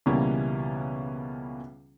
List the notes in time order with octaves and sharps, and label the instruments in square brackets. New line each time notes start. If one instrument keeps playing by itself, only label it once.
[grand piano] C#2 B2 E3 G3 A#3 C#4